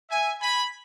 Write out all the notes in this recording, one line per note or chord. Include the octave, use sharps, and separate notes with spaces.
E5 G#5
G#5 B5